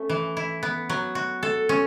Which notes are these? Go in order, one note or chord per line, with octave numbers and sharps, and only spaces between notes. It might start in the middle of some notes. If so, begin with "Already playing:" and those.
Already playing: A3 C#4
E3
E4
B3
F#3
F#4
A4
C#4